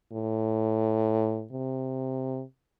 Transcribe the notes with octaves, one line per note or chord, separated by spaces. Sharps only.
A2
C3